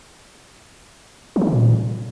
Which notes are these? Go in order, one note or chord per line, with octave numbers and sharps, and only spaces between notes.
F3
F#3
D3
A#2